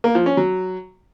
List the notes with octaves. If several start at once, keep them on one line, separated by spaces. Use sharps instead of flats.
A#3
F3
C#4
F#3